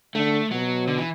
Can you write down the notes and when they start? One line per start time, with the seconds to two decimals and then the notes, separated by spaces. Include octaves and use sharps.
0.15 D3 A3
0.51 B2 F#3
0.87 D3
0.98 E3